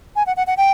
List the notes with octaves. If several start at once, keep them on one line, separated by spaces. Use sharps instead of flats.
G#5
F#5
F#5
F#5
G5